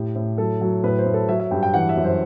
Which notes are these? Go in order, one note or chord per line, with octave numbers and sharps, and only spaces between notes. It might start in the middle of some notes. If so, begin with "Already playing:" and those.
Already playing: A2 G4
A2
F#3 A4
F#3
A2 B4
C5
A2
A4
F#3 E5
E5
G2 G5
G5
E3 F#5
E5
F#2
C5